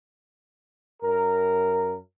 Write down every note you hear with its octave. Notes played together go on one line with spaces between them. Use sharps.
F#2 A#4